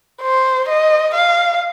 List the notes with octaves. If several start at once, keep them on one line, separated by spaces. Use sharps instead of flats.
C5
D#5
F5